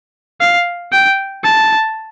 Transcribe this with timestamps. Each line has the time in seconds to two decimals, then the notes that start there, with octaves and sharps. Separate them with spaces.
0.41 F5
0.92 G5
1.44 A5